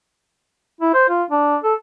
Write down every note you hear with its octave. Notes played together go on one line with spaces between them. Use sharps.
E4
C5
F4
D4
A4